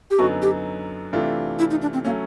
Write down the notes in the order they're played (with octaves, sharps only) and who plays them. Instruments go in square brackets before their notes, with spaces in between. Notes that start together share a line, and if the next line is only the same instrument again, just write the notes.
[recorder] G4
[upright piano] F#2 D3 F#3 B3 D#4 [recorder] F#4
[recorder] G4
[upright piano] C3 E3 A3 D4 F4
[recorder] E4
D#4
D4
C4
[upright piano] F#3 A3 C#4 [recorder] A#3